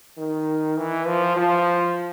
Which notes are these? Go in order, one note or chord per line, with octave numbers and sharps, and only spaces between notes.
D#3
E3
F3
F3